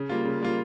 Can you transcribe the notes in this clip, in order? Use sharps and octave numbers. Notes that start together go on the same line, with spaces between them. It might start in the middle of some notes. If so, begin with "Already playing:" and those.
Already playing: C#3
G3 A#3 F4
C#3
G3 A#3 F4